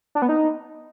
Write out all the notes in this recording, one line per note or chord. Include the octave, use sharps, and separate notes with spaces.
D4
B3
D#4